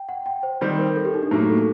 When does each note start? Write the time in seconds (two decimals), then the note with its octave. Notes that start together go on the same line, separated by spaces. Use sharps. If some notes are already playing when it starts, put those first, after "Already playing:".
Already playing: G5
0.09 F#5
0.26 G5
0.43 C5
0.61 D#3 G3 C4 C5
0.79 A#4
0.96 A4
1.05 G4
1.14 D#4
1.23 D4
1.31 A2 F#3 A#3 D#4
1.50 A4